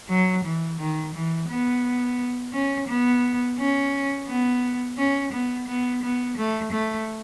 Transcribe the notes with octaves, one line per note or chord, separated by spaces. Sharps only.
F#3
E3
D#3
E3
B3
C#4
B3
C#4
B3
C#4
B3
B3
B3
A3
A3